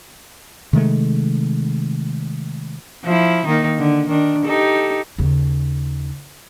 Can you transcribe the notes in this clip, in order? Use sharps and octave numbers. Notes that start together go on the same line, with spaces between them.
C3 D#3 G#3 A3
F3 E4
D#3 A#3 D#4
D3
D#3 D4
D#4 G4 A4
D#2 C#3